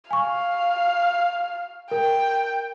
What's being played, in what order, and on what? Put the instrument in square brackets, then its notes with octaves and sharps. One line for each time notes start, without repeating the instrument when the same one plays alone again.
[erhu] F5 [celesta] G#5 C#6
[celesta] A#4 [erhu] G5